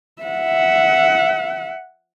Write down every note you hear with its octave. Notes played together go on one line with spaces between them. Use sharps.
E5 F#5